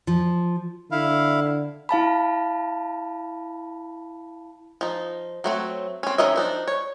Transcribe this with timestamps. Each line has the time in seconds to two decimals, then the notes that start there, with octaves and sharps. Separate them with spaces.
0.07 F3
0.91 D3 E4 F5
1.89 E4 F5 A5 B5
4.81 F3 D#4
5.44 F#3 A3 C4
6.03 C4 C#4
6.18 D#3 C#4 A#4 D#5 E5
6.36 F3 D4 D#4
6.68 C#5